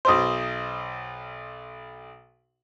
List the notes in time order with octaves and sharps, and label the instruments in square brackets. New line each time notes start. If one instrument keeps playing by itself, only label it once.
[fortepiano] B1 B2 C5 [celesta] C6 D#6